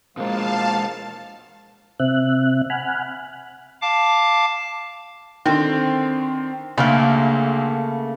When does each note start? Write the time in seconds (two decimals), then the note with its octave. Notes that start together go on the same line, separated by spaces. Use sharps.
0.17 B2 F3 G#3 A#3 F5 A5
2.00 C3 C4 E5 F#6
2.70 F#5 G#5 B5 F6 F#6
3.81 F5 A5 D6
5.46 D3 D#3 C4
6.78 D2 C#3 A3 A#3